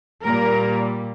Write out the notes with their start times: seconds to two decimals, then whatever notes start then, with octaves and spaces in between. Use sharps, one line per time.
0.24 A#2 G3 A#3 A#4